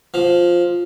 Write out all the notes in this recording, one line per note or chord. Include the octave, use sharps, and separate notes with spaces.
F3